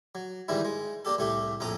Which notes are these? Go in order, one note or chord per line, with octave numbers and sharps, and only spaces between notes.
F#3
G#2 D#3 E3 G3 E4
G#3
A#3 D4 G4 A4
C2 A2 A3 G4 A4
A#1 F2 A2 A4 A#5 D#6